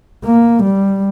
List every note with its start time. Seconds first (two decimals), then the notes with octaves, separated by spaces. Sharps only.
0.24 A#3
0.63 G3